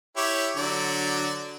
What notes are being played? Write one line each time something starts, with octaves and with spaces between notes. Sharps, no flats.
E4 G4 C#5
D3 F#3 D5